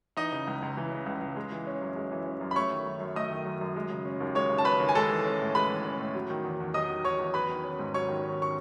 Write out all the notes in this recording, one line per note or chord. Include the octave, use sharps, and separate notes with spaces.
E3 D#4 D#5
C#3
C#2
C#2
E3
C#3
C#2
C#2
G#3
E3
C#4
F#2
G#3
E3
C#4
F#2
B5
A3 C#5 C#6
D#3
F#2
F#2
A3 D#5 D#6
D#3
F#2
F#2
G#3
C#3
C#4
D#2
G#3 C#5 C#6
C#3
A5
C#4 B4 B5
D#2
G#5
G#3 A4 A5
E3
C#4
A2
G#3 B4 B5
E3
C#4
A2
F#3
D#3
E2
E2
F#3 D#5 D#6
D#3
E2 C#5 C#6
E2
F#3 B4 B5
D#3
C#4
G#2
F#3 C#5 C#6
D#3
C#4
C#6